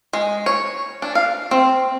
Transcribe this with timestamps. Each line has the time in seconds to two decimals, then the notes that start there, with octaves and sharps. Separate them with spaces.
0.13 G#3
0.46 C#5
1.02 D4
1.15 F5
1.51 C4